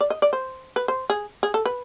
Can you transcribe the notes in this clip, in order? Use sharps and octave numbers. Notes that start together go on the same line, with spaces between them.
D5
D#5
D5
C5
B4
C5
G#4
G#4
A4
B4